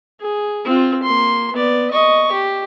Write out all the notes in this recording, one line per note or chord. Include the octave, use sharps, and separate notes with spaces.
G#4
C4 F4
A#3 C6
B3 D5
D#5 C#6
G4